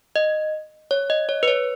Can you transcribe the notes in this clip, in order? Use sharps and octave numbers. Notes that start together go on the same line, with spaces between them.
D#5
C#5
D#5
C#5
B4
C#5